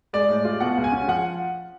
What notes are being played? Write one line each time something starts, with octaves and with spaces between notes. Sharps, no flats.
G#3 D5
A2
F4
B2 F#5
C#2
G#5
C#4
F3 F#5